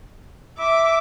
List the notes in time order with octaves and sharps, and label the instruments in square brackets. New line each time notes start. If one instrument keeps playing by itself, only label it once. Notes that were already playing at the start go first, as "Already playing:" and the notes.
[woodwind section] E5 [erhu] D6